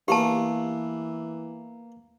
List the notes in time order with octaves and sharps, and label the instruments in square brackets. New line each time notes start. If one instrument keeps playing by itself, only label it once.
[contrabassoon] E3 [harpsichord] A#3 B3 [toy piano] G4 A5